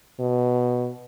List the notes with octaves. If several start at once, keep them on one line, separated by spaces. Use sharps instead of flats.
B2